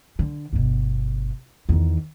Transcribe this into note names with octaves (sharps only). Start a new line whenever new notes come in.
D3
G1 B2
E2 D#3